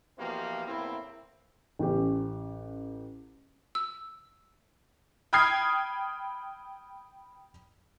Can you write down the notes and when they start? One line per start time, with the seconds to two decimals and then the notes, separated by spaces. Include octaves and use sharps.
0.19 B2 E3 F3 A#3 C4 G4
0.67 E2 A2 A#3 C4 E4
1.79 A1 C#4 G4
3.75 E6
5.33 G5 B5 D#6 F6 G#6 C7